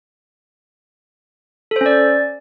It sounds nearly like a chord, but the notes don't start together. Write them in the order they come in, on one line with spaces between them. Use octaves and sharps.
A4 C5 C#4 D5